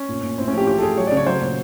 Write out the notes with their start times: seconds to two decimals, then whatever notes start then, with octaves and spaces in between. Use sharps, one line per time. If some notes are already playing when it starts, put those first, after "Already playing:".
Already playing: C#4
0.09 A#2
0.23 A#2
0.38 A2 C4
0.48 C#4
0.53 F3 G4
0.67 E3 G4
0.78 A4
0.82 A2 G#4
0.97 F#3 C#5
1.07 D5
1.12 C#3
1.17 C#5
1.27 F#3 C5
1.41 A#2